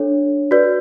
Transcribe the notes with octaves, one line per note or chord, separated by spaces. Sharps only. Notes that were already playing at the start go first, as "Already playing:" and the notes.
Already playing: D4 A4 C#5
F#4 B4 D5